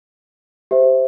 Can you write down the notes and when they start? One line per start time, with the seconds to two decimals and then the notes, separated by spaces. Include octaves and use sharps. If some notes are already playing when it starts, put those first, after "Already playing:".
0.71 G4 C5 E5